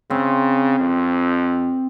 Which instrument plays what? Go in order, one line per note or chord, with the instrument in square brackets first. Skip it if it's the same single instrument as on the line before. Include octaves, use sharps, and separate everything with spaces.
[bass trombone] C#3 [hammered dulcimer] C4
[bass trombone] F2